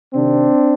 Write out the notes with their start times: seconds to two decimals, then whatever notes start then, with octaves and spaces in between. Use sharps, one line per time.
0.13 C3 D#3 C4 D4